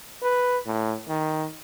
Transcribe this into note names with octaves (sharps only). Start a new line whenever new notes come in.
B4
A2
D#3